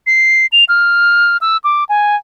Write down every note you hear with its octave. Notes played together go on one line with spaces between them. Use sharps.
C7
F7
F6
E6
D6
G#5